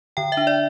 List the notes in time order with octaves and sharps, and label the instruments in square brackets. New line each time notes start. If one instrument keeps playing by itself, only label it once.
[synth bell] D3 G5
E5
D4
D5